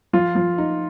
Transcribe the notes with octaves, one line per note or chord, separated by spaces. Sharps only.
F3 F4
F3
D#4